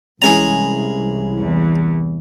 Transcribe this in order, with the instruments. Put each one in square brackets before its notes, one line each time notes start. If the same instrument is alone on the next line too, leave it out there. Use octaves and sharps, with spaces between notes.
[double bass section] C2 [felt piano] E3 G#3 C#4 [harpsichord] G#4 G#5 A#5
[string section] E2